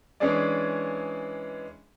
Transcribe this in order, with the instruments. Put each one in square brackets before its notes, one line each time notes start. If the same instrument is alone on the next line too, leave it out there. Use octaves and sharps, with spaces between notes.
[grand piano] E3 G#3 C#4 D4 G#4 D5